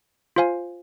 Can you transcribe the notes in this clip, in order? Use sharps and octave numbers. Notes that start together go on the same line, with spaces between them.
F4 C5 F5 G#5